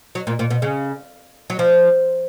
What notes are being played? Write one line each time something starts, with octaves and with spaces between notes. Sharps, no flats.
F#3
A#2
A#2
B2
C#3
F#3
F3